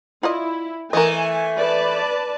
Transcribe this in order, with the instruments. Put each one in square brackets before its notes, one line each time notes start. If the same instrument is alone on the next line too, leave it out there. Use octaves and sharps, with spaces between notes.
[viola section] E4 [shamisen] F4 D5 D#5
[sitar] E3 A3 [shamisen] A#4 D#5 [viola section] G#5
[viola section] B4 D5 A5